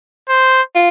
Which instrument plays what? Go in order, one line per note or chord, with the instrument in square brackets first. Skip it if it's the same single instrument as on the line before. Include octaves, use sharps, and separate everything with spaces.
[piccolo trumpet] C5
[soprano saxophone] F4